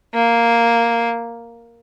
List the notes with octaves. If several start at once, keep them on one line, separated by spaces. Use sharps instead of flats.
A#3